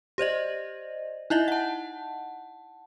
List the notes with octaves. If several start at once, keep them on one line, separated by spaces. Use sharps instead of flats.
G4 C5 D5 D#5
D#4 E4 D#5 E5
F#5 A5